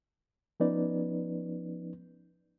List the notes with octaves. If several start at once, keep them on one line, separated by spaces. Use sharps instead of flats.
F3 B3 C#4 D#4 B4 D5